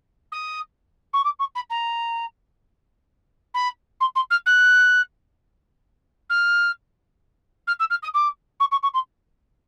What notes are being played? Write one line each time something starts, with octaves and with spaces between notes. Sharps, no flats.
D#6
C#6
D6
C#6
B5
A#5
B5
C6
C6
F6
F#6
F6
F6
E6
F6
D#6
D6
C#6
C#6
C#6
C6